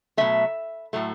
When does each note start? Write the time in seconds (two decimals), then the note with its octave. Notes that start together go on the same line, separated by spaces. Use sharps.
0.17 B2 F#3 A3 E5
0.93 A2 F#3 A3